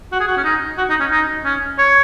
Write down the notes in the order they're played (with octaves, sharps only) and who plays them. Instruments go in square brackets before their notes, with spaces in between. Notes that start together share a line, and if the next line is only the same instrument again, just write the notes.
[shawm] F#4
G#4
F#4
C#4
D#4
F#4
D#4
C#4
D#4
C#4
C#5